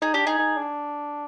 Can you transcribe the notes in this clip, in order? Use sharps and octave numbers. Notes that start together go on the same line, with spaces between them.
D#4 G#4
D4 G4
D#4 G#4
D#4
D4